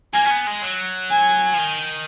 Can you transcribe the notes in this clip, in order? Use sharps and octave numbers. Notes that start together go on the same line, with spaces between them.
A#3 G#5
C#4
B3
G#3
F#3
G#5
F3
D#3